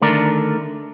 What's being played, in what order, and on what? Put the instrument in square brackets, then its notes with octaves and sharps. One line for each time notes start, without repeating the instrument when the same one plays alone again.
[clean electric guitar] D3 D#3 A3 D4 A#4 D5